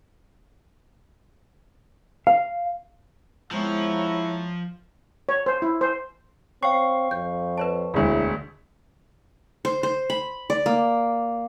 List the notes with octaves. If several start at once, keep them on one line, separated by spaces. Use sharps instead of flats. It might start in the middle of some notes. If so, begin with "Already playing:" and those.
F5
F3 G#3 B3 C4 E4 C#5 F#5 A#5
C#5
C5
E4
C5
C4 C#5 F5 G5 C#6 C7
F2 G6
B4 C#5 A5
E1 D2 E4 G#4 C#5
C5
C5
B5
D5
A#3